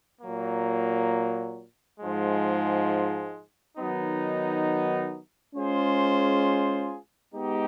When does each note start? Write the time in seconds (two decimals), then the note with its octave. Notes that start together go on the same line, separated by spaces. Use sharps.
0.21 A#2 F#3 A#3
2.00 G#2 F3 G#3
3.78 D#3 F#3 B3 D#4
5.56 G#3 C#4 F4 G#4 C5
7.33 G#3 B3 D#4 G4